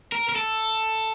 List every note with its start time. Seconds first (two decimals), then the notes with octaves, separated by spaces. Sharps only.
0.12 A#4
0.29 A#4
0.36 A4